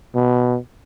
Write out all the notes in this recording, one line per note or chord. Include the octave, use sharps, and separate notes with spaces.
B2